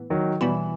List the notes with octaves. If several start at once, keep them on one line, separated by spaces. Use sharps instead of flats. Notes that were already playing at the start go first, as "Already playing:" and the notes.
Already playing: A2 E3 B3
D#3 F#3
B2 E3 G3 B3 E4